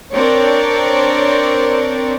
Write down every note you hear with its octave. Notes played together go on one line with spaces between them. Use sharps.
C4 D4 A#4 C#5 D5